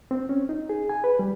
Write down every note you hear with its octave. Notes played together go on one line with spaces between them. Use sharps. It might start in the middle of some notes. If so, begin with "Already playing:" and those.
C4
C#4
D#4
G#4
G#5
B4
G3